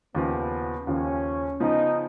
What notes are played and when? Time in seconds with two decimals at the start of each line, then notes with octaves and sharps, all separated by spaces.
0.15 D#2 C#3 F3 B3
0.87 D#2 C#3 F3 C#4
1.60 C#3 F3 B3 D#4